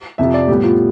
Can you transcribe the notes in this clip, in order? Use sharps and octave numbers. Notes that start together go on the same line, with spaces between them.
F2 C3 F3 E5
D5
A2 G3 B3 G4
F4